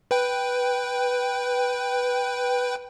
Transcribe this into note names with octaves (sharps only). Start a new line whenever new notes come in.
B4 G5